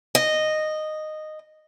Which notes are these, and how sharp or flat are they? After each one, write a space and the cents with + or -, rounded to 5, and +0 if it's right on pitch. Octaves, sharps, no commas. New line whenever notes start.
D#5 -10